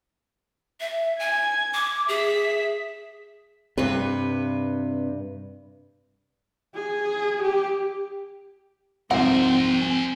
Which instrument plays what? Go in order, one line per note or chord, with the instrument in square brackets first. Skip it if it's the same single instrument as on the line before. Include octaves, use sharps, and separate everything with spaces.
[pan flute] E5
[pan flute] G#5 [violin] G#6
[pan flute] D6
[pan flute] G#4 [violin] E5 B6
[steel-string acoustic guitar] G2 B4 [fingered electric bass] C3
[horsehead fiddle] G#4
G4
[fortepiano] C2 F2 G#2 [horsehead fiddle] C4 [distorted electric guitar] A#4 C5 [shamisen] F#5
[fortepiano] G#5